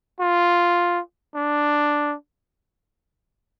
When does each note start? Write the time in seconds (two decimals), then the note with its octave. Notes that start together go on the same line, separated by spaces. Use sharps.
0.20 F4
1.35 D4